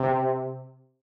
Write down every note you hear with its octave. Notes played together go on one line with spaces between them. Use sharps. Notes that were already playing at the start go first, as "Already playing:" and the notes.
Already playing: C3